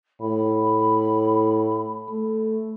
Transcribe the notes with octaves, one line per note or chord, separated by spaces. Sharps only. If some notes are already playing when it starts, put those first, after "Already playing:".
A2 B5
A3